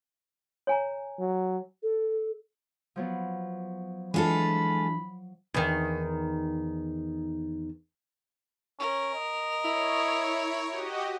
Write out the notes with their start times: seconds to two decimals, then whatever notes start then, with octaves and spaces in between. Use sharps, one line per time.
0.67 C#5 G#5 A#5
1.19 F#3
1.83 A4
2.96 F3 F#3 B3
4.14 E3 G#3 D4 E4 F4 A4 B5
5.54 E2 D#3
8.80 C#4 A#4
9.15 D#5
9.65 E4 C#5
10.69 F#4 G4 D#5